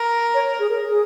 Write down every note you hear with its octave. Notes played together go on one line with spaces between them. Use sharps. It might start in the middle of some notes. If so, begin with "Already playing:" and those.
Already playing: A#4
C#5
G#4
A#4
G#4